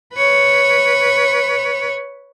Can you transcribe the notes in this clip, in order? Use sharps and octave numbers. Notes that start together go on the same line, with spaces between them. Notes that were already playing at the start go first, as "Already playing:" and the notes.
B4 C#5